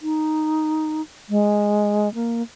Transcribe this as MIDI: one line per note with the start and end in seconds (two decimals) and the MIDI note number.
0.02 1.02 63
1.29 2.12 56
2.14 2.42 58